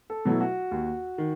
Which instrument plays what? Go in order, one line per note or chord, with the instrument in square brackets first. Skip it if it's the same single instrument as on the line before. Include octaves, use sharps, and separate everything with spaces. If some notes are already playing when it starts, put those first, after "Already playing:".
[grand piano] A4
[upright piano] B2 F#3 A3 E4
[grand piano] F#4
[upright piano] D#2
D#3